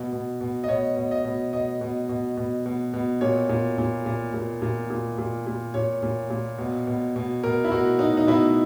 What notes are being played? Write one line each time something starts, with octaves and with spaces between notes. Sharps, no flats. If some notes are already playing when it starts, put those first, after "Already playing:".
Already playing: B2
B2
B2
D#5
B2 C#5
B2
D#5
B2
B2 D#5
B2
B2
B2
B2
B2
A#2 C#5
A#2
A#2
A#2
A#2
A#2
A#2
A#2
A#2
A#2 C#5
A#2
A#2
B2
B2
B2
B2 A#4
E4
B2 F#4
B2 D#4
D#4
B2 E4